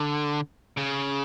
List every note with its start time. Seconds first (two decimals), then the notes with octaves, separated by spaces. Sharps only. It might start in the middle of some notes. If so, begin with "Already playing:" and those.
Already playing: D3
0.78 C#3